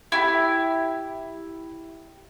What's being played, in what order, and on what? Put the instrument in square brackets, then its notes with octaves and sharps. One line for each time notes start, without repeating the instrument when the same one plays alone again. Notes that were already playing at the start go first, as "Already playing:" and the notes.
[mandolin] E4 G4